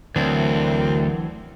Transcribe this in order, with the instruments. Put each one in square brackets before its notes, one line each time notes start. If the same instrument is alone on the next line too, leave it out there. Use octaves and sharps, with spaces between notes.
[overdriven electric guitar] D2 [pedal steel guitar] E3 F#3 D4 [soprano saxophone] C4 [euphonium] A#4